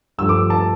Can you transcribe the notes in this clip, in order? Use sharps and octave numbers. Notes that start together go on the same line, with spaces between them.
G2 F3 A3 E6
D6
A5